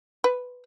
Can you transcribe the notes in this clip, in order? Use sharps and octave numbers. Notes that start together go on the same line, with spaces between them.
B4